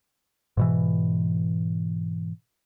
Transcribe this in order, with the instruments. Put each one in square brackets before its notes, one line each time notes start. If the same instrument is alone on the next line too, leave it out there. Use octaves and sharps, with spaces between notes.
[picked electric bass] G#2 B2 E3